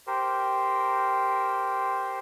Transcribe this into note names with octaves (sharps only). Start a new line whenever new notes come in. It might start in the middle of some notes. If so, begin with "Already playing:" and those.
G4 A#4 C5